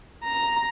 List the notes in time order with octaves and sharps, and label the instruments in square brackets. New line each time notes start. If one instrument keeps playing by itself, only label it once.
[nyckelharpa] A#5